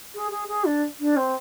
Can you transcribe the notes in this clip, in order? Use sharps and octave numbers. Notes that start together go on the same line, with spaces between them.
G#4
G#4
G#4
D4
D4
C4